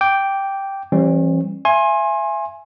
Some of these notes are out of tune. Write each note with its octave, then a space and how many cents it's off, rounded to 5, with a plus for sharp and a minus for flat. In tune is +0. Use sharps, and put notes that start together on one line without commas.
G5 +0 D6 -10
E3 +30 G3 +0 C#4 -45
E5 +30 G#5 +0 C6 +30